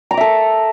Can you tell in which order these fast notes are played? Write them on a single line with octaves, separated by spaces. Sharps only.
A#5 D6 E5 A4